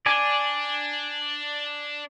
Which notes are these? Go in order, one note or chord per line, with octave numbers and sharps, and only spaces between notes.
D4 D5 G#5